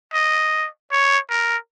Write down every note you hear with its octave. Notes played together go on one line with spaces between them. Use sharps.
D#5
C#5
A#4